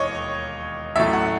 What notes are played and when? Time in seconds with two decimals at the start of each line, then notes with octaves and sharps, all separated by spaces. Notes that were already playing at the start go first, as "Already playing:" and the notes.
Already playing: E1 D#2 C#5 D#5
0.96 A1 A2 F#3 A3 E5
1.13 F#5